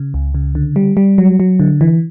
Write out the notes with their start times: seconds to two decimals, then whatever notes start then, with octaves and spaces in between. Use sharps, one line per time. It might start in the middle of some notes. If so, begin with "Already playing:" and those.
Already playing: C#3
0.14 C#2
0.35 C#3
0.55 D3
0.76 G3
0.97 G3
1.18 F#3
1.40 F#3
1.60 D3
1.81 E3